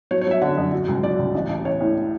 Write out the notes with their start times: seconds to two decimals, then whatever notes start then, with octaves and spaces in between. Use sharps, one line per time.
0.11 F#3 C#5
0.21 C#5
0.27 F#3 E5
0.42 D3 F#5
0.57 F#2
0.72 F#3
0.88 C#2
1.03 F#3 D5
1.19 C#2
1.34 A1
1.49 A1
1.65 A1 C#5
1.80 A2